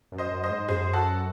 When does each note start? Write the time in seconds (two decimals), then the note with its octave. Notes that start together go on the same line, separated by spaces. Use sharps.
0.12 F#2
0.18 C5 D#5
0.32 F#2
0.43 C5 D#5
0.50 G#2
0.68 F#2 G#4 C5
0.93 F#4 A4